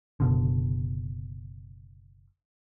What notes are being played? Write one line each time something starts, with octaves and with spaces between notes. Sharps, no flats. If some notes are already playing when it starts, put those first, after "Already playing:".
F#1 B2 D3